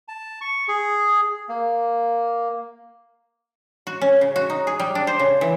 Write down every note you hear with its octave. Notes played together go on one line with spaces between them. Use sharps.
A5
C#6
G#4
A#3
F#4
C#4
C#3
F#4
D#4
G#4
G3
D4
C5
C#3
E3